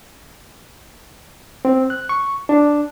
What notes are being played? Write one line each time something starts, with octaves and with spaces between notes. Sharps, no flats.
C4
F#6
C#6
D4